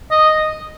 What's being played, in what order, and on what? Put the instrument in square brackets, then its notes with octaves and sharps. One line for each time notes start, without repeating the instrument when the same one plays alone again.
[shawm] D#5